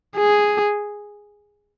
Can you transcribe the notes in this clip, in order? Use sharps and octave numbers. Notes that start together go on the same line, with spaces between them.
G#4